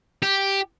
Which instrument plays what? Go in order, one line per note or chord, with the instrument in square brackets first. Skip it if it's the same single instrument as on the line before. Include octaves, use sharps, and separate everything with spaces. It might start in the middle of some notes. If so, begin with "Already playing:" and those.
[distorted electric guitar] G4